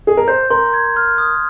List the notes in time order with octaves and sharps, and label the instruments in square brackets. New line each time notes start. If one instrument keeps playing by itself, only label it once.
[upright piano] G#4
A#4
[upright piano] C5 [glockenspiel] G6
[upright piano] A#4 [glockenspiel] C6
[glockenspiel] G#6
F6
D#6